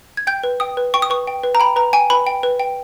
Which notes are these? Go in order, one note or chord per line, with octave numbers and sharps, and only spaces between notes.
G#6
G5 G6
B4
G5 D#6
B4
G5 C#6
D#6
B4 C#6
G5
B4
A#5
G5 B5
B4 A#5
G5 G#5
B4 B5
G5
B4
G5